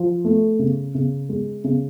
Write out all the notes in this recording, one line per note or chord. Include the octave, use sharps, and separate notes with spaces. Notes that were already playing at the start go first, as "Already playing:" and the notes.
Already playing: F3
A3
C#3
C#3
G#3
C#3